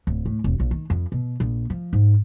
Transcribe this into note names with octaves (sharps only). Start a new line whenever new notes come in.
D1
A2
E1
A#1
D#3
F2
B2
A#1
F3
G#2